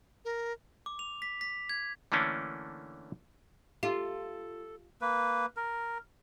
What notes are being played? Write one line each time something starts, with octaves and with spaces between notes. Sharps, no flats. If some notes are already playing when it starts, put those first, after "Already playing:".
A#4
D6
F7
B6
B6
G#6
D3 E3 A3 A#3 C#4 D4
F4 G4 A4
A#3 B4
A#4